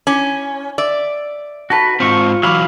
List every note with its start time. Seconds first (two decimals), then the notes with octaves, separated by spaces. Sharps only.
0.07 C#4 E4 D6
0.78 D5 E5
1.70 D#4 F#4 A4 B4 A5
2.00 G#2 C4 F4 C#6
2.43 E3 F#3 F5 F#5 B5 D6